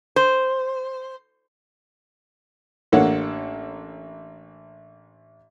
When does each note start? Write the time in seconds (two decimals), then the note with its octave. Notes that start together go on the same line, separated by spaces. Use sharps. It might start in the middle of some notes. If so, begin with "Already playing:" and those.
0.16 C5
2.92 A1 A#3 D4 A4 C#5 F#5